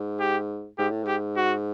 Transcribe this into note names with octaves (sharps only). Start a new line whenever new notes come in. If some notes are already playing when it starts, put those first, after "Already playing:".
Already playing: G#2
G4
G#2 G4
A2
G#2 G4
F#4